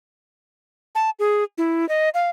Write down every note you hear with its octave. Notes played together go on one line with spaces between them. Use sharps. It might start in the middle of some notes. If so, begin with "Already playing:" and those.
A5
G#4
E4
D#5
F5